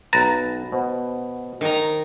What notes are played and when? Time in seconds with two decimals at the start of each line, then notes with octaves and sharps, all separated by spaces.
0.13 B1 B4 A#5 B5 A6 A#6
0.72 B2 C5 F#5 B5
1.61 D#3 A#5